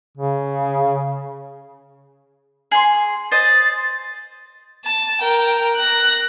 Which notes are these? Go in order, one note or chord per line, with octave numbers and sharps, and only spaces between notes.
C#3
G#4 C6
C5 D#5 A6
A5
A#4 G5
F#6 A#6